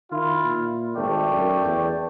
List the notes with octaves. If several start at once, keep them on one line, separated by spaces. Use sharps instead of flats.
D#3 E4 F4
A#2
G#1 A3 D5 G5
F#2
E2